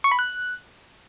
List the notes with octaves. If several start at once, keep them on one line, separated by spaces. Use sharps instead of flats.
C#6
B5
F#6